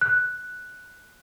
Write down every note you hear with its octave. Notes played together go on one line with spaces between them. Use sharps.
F#6